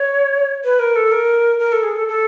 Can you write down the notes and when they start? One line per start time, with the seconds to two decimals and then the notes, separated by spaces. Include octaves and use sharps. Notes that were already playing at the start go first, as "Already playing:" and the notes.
Already playing: C#5
0.64 B4
0.79 A#4
0.96 A4
1.12 A#4
1.59 A#4
1.72 A4
1.83 G#4
1.96 A4
2.08 A4